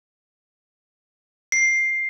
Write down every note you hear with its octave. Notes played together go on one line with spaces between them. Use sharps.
C7